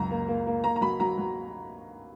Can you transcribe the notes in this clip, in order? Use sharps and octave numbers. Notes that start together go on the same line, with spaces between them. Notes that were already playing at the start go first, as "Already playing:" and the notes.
Already playing: C#2 F#2 A#5
A#3
A#3
A#3
A#3 A#5
A#5
F#3 B5
F#3 A#5
F#3